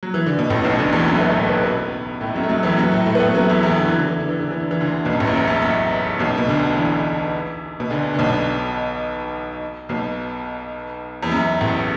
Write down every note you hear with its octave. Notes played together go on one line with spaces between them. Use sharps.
F#3
E3
D3
B2
A1 A2
B1 B2
D2 D3
E2 E3
F#2 F#3
A3
B2 B3
A2 A3
B2 B3
B2 B3
A2 A3
F#2 F#3
A3
F#2 F#3
E2 E3
F#2 F#3
A2 A3
A2 A3
B3
A2 A3
F#2 F#3
E2 E3
E2 E3
D3
E3
D3
E3
D3
E3
D3
E3
D3
E3
D2 D3
B1 B2
F#2
A1 A2
E2
F#2
E2
F#2
B1 B2
B2
D2 D3
D3
E2 E3
B2
D2 D3
D3
B1 B2
B1 B2
E2
F#2
A1 A2